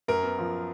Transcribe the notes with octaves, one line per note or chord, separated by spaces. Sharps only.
F#2 A#4
B3
F3